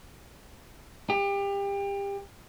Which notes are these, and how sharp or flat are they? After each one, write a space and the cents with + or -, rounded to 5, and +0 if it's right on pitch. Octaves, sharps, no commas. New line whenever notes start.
G4 +30